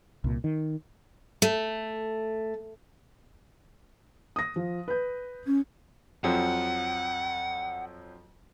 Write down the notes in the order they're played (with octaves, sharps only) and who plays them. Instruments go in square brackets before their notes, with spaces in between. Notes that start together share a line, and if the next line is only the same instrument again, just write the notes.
[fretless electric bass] C2 A#2
D#3
[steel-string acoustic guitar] A3
[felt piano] D#6 A#6
F3
B4 G6
[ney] C#4
[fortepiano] F2 F3 F#3 [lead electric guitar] F#5